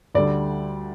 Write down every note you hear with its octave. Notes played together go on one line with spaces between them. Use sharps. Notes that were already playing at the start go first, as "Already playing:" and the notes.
D2 D3 G3 D5